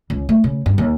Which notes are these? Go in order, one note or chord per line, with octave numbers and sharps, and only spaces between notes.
C#2
A3
C#3
G2
D#2